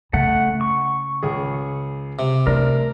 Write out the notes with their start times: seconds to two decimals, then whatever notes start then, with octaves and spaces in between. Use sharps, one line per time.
0.13 C#3 A3 F#5
0.61 C#6
1.23 C#2 G#4
2.19 C3
2.47 A3 D4 A#4